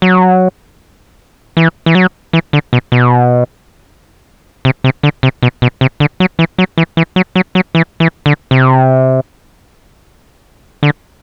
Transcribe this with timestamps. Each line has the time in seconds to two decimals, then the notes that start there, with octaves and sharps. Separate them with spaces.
0.02 F#3
1.57 E3
1.86 E3
1.95 F#3
2.33 E3
2.53 D3
2.73 B2
2.92 B2
4.65 C3
4.84 C3
5.03 D3
5.23 C3
5.43 B2
5.62 B2
5.81 C3
6.00 D3
6.20 F#3
6.39 E3
6.58 F#3
6.78 E3
6.97 E3
7.16 F#3
7.36 F#3
7.55 F#3
7.75 E3
8.00 E3
8.26 D3
8.51 C3
10.83 D3